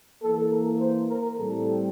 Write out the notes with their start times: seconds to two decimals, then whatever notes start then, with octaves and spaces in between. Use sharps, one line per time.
0.22 E3 A#3 A4
0.51 A#4
0.80 C5
1.10 A#4
1.39 A2 G3 C4 A4